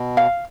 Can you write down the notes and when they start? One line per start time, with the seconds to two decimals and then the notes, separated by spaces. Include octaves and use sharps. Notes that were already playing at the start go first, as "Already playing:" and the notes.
Already playing: B2
0.17 F5